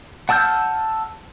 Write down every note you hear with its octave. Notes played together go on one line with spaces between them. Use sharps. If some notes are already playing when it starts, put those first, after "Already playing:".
F#5 A5 E6 F6 G6